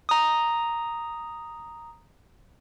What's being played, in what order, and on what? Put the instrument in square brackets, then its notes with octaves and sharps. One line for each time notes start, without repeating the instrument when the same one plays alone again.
[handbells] A#5 D#6